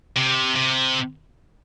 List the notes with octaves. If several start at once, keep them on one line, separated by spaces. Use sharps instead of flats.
C3
C3